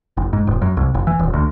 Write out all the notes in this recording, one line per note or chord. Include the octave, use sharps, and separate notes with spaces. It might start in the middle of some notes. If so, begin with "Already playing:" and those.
F#1
G#2
D#1
F#2
C2
F#1
E3
D#1
D2